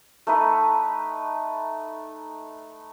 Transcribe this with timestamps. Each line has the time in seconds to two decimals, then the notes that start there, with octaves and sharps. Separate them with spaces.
0.27 A3 D#4 B4